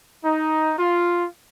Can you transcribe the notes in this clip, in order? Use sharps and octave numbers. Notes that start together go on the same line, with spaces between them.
D#4
F4